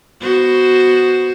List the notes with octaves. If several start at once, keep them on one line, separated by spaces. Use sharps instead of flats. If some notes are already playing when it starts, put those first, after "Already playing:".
B3 F#4 C5